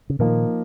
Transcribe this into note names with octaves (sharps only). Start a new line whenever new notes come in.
C#3
A#2 D#3 F3 A#3 D#4 A#4